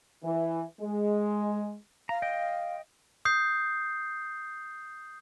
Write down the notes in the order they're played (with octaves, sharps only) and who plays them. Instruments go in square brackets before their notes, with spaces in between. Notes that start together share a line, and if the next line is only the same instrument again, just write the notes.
[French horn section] E3
G#3
[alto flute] F5 [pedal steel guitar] A#5
[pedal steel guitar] D#5 G5
[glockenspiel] D#6 G6 C7